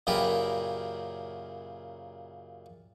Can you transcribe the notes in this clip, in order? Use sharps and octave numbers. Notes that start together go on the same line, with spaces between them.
F#2 A#2 C#3 G4 A#4 B4